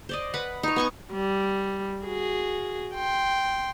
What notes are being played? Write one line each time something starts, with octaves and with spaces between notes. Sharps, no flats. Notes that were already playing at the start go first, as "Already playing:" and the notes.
C5 D5 D#5
B4 F#5 B5
D#4 C#5
B3 G#5 C#6
G3
F#4 G#4
G5 C6